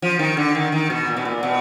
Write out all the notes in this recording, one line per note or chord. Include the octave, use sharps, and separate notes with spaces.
F3
D#3
D3
D#3
D#3
B2
A#2
B2
A#2
B2